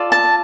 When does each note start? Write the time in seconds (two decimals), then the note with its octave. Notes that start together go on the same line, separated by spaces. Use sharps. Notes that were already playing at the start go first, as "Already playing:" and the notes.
Already playing: F4 A4 D5
0.12 A5